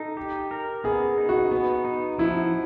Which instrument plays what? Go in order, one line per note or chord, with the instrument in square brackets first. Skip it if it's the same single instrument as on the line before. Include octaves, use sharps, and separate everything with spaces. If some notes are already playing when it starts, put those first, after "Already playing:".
Already playing: [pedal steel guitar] D#4 [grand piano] A4
[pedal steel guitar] G4
A#4
[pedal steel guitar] B3 [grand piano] G#4
[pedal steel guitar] D#4
[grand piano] F#4
[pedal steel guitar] B3
D#4
[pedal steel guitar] F3 [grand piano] E4